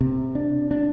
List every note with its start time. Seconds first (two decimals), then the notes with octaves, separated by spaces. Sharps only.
0.01 C3
0.35 D4
0.71 D4